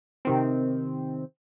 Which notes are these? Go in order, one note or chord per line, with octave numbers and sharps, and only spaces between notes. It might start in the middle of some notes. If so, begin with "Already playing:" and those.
C3 D#3 C4